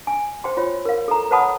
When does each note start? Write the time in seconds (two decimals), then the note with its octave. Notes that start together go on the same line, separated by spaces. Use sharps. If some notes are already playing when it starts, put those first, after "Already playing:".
0.07 G#5
0.44 C5 G5 C6
0.57 F4 C#5
0.85 A#4 F5
1.08 A4 A#5
1.31 B4 C#5 F#5 A5 B5 D#6